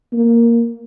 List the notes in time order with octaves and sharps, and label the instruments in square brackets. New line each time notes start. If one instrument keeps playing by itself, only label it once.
[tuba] A#3